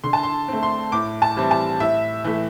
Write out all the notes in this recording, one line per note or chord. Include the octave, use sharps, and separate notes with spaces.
D3 C6
A5
C6
A3 C4
C6
A2 D6
A5
E3 G3 C4
A5
A2 E5
E3 A3